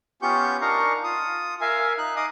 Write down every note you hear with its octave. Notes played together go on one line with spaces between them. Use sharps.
B3 C#4 F4 G4 C#6 G6
D4 D#4 A#4 F5 A#5 C#6
F4 D#6
A#4 E5 F5 G#5
D#4 F#6
D#5 F5 D6 D#6